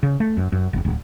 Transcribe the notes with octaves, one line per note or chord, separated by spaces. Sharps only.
C#3
A3
F#2
F#2
E1
D1